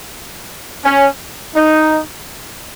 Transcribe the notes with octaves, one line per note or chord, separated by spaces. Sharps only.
C#4
D#4